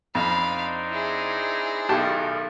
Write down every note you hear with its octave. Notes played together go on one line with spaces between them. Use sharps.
F2 C4 D4 D#4 F5 B5
E4 G#4
B1 F#2 A2 D#3 G4 A5